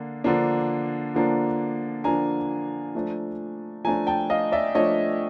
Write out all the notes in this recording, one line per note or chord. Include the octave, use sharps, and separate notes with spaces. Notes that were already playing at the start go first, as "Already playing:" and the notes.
Already playing: D3 A#3 D4
D3 F3 A#3 D4
D3 F3 A#3 D4
D3 F3 A#3 D4 G#5 A#5
F3 A3 D4
F3 A3 D4 G#5 A#5
G5 A5
D#5 F5
D5 E5
F3 A3 D4 C#5 D#5